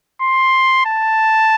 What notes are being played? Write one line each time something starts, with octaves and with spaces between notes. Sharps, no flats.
C6
A5